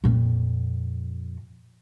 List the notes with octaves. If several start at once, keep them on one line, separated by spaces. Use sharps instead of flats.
F2 A#2